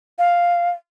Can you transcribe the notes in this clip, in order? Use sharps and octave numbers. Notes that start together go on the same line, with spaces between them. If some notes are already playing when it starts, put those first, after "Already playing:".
F5